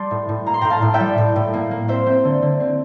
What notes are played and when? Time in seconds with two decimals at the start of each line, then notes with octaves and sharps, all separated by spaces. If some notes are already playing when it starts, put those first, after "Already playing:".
Already playing: G3 A5 C6 D6
0.11 A2
0.29 A2
0.46 A#3 A#5
0.54 C6
0.61 A2 G5 A#5
0.70 F5 A5
0.82 A2
0.94 E5 G5
1.00 G3
1.18 A2
1.36 A2
1.54 A#3
1.71 A#3
1.88 C4 C5 E5
2.06 C4
2.24 D3
2.42 D3
2.60 C4